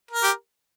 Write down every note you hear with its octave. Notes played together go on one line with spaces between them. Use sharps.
A#4
G4